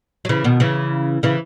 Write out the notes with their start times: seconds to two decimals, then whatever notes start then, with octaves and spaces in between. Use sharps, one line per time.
0.25 F#3
0.29 C#3 E3
0.44 B2 D#3
0.60 C#3 E3
1.23 C#3 E3